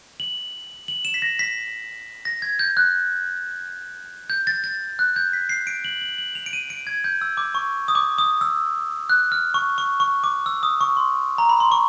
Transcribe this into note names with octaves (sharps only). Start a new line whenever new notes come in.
F#7
F#7
E7
B6
A#6
B6
A#6
G#6
G6
F#6
G6
A6
A6
F#6
G6
B6
C7
D7
F#7
F#7
F#7
F7
D7
D#7
D7
G#6
G6
E6
D6
C#6
D#6
D6
D#6
E6
F#6
F6
C#6
C#6
C#6
D6
E6
D#6
C#6
C6
A#5
B5
C6
C#6